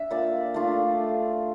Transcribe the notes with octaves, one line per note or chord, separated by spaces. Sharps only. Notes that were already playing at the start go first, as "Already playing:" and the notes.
Already playing: D4 E5
A#2 D5
A3 D4 F4